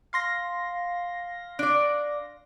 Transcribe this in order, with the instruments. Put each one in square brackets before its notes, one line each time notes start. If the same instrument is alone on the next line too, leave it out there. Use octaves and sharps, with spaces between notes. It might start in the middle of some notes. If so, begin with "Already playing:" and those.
[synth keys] F5 C6 A#6
[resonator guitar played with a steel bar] D4 D5